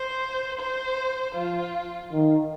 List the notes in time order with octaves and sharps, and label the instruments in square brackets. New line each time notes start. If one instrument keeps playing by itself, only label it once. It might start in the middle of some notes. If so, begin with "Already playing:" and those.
Already playing: [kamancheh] C5
C5
[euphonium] F3 [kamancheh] F4
[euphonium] D#3